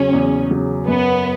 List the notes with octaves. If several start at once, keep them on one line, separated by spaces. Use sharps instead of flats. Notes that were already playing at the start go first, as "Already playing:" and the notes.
Already playing: E2 C#3 F#3 C#4
E2
C#3 F#3
F#2 B3